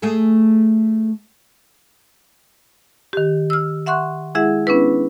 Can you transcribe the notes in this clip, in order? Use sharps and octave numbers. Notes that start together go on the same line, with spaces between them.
A3 G#4 A4
D#3 G4
E6 F6
E5 F#5 C6 C#6 F#6
G#3 E4 G#4 E5 F#5
B3 C#4 D4 E4 B4